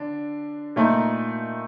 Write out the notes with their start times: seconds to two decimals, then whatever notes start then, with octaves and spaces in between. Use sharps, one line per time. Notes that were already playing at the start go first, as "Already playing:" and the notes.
Already playing: D3 D4
0.76 A#2 A3 D#4